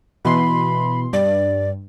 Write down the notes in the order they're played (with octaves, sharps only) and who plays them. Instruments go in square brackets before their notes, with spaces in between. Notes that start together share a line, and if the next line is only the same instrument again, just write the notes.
[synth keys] B2 E3 C6 [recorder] B5
[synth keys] G2 [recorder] D5